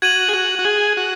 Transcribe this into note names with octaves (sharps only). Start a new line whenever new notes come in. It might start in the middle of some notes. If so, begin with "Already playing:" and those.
F#4 G#6 D#7 F#7
G#4
F#4
F#4
G#4
F#4